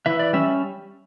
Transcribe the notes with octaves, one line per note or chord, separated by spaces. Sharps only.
E3 E5
D5
G3 C#4 E5